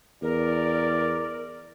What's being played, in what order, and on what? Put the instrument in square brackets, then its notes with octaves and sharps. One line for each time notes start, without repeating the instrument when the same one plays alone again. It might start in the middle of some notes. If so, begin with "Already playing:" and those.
[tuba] E2 [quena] A#4 [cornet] D5